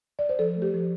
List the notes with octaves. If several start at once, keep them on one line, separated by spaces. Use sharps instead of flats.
D5
C5
F3 A4
A3
G4
F3